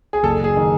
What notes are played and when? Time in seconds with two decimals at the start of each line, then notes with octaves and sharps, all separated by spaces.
0.13 G#4
0.23 F#1 A4
0.44 G#4
0.57 D#3